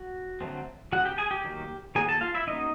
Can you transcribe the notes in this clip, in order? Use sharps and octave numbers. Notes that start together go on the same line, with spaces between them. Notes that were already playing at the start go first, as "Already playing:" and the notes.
Already playing: F#4
D3 F#3 A3 C4
C#3 F#3 B3 F#4 F#5
G4 G5
G#4 G#5
G4 G5
D#3 F#3 A#3
D#3 F#3 A#3 G#4 G#5
A4 A5
F4 F5
E4 E5
F#3 A#3 C#4 D#4 D#5